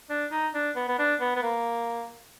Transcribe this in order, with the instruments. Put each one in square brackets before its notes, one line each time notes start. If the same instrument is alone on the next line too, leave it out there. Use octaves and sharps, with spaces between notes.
[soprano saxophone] D4
D#4
D4
B3
B3
D4
B3
B3
A#3